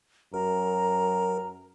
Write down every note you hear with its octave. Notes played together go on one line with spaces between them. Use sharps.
F#2 A#4 A#5